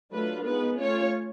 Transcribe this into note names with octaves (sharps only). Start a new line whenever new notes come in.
F#3 A3 D4 F4 B4
G#3 B3 D#4 B4
A3 C#4 F4 C#5